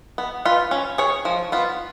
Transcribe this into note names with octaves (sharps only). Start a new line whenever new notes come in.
B3
F4 B4
C#4
G#4 C#5
F3
B3 F4